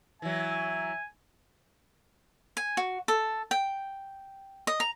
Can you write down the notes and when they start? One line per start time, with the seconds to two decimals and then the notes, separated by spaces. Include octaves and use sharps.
0.22 E3 F#3 E5 G#5
2.57 G#5
2.77 F#4
3.08 A4
3.51 G5
4.67 D#5
4.80 A#5